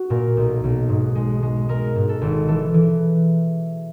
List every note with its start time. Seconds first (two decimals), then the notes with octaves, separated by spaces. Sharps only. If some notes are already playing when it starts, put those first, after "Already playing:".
Already playing: F#4
0.10 A#2 A#4
0.37 B1
0.64 B1
0.89 G#2
1.15 G#3
1.42 G#3
1.69 G#3 A#4
1.96 G#2
2.09 A4
2.21 G#1
2.48 E3 A4
2.74 E3